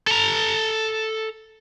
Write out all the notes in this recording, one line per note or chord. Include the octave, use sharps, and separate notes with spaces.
A4 A#5